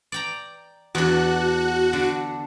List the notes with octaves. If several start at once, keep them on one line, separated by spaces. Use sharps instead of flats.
D5 G5 A#5
E2 D4 F#4 F#6
D3